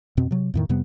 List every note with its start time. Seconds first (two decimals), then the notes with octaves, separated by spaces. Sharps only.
0.17 F2 B2 C4
0.31 C3 F#3
0.54 E2 A2 D#3
0.69 F2 C3 G3 B3